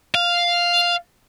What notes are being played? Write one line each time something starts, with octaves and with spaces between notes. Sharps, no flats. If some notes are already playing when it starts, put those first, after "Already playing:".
F5